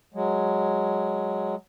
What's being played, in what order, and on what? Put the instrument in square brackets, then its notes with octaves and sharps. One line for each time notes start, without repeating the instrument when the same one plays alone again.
[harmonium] F#3 G#3